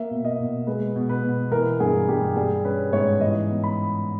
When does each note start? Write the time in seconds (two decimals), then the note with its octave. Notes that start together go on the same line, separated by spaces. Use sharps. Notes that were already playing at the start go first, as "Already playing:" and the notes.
Already playing: A#3 E5
0.11 B2
0.25 D#5
0.40 B2
0.67 G#3 B4
0.96 B2
1.09 B4
1.23 B2
1.52 E3 A#4
1.80 G2 G#4
2.09 G2 G4
2.36 G3 G#4
2.64 C#4 B4
2.93 G#2 C#5
3.21 E3 D#5
3.49 B3
3.64 B5